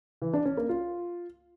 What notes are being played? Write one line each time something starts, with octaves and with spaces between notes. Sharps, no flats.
E3
D4
C#4
A#3
F4